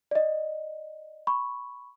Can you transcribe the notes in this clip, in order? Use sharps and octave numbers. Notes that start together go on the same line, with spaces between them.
D5 D#5
B5 C#6